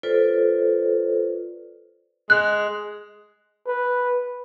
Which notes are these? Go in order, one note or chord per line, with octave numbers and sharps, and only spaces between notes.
F4 A4 B4 C5 D5
G#3 F#6
B4